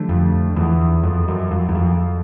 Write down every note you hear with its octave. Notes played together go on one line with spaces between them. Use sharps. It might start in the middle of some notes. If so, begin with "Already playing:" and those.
Already playing: D3 F3 A3 D4 G4
F2
E2
F2
F#2
F2
E2
F2